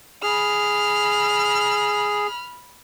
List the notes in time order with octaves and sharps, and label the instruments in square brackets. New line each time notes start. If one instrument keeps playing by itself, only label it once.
[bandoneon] G#4 [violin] B5 F6